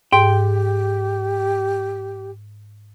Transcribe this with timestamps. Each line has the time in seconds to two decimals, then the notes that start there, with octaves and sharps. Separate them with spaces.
0.13 G#2 G4 G5